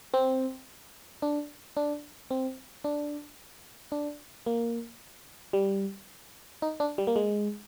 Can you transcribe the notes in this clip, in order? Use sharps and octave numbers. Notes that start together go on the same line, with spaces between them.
C4
D4
D4
C4
D4
D4
A#3
G3
D#4
D4
G3
A#3
G#3